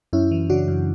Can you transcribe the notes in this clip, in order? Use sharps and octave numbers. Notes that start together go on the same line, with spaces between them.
F#2 C#4 E4
E3
C#3 D4 F#4
F#2